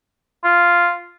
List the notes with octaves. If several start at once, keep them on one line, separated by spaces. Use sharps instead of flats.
F4